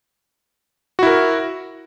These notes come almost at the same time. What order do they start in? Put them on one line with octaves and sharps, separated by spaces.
F#4 E4 A#4